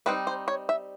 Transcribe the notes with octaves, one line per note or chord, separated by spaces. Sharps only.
G3 C4 D#4 B4
C5
C#5
E5